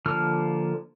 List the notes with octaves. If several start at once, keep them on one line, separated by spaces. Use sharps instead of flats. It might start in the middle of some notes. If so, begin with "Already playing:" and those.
D3 F3 A#3 F6